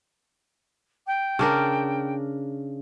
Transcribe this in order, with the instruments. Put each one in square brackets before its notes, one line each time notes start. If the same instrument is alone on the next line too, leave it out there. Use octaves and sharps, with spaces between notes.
[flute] G5
[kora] C#3 D4 A#4